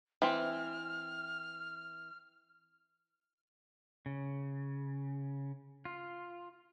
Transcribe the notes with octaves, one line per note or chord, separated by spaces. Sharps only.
E3 C4 F6
C#3
F4